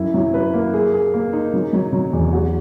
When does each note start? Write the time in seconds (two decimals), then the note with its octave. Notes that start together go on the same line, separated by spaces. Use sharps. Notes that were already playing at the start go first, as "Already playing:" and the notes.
Already playing: F#2 E4
0.14 F#3
0.34 B4
0.53 A#3
0.74 G#4
0.94 G#4
1.14 A#3
1.33 D#4
1.53 F#3
1.73 F#3
1.93 F#3
2.13 E2
2.33 F#4